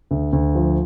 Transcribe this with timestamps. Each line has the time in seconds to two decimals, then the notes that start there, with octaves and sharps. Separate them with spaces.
0.11 D2
0.33 D2
0.55 F3